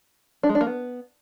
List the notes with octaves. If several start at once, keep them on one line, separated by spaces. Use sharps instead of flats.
D4
G#3
D4
A#3
B3